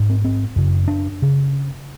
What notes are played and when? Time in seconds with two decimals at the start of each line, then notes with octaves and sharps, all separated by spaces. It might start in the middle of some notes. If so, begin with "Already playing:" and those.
Already playing: G#2
0.10 C4
0.24 C4
0.56 F#2 C#3
0.88 D4
1.22 C#3